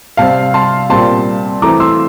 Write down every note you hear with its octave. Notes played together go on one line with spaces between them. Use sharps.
C3 G3 C4 F5 A5
A5 C6
A#2 G3 C4 A5 C6
E3 A3 C4 A#5 D6
C6 E6